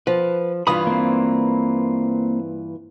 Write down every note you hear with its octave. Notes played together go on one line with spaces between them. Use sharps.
F3 B4
G2 E3 F4 B5 D#6
A#3 C4